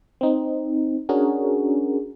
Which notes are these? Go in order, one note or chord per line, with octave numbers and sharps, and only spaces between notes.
C4 D#4
C#4 D4 F#4 G#4 A#4